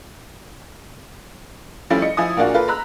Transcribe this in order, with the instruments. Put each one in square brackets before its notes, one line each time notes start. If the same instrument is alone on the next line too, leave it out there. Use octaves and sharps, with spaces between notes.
[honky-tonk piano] F3 G3 A3 C#4 E4 F4
D#5 C#7
F3 E4 G#5 D#6
A#2 A#3 D4 F4 F#4 G#4
A#3 F4 A4 B4
A#5 B5 E6 F#6